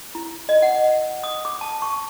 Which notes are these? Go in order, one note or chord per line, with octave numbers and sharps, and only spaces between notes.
E4
D#5
F#5
D#6
D6
A5
C#6